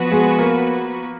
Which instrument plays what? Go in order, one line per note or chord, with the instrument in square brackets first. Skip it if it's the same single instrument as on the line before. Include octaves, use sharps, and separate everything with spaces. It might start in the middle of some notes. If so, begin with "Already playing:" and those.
Already playing: [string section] F3 B3 F#4 B4
[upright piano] G#3
A#3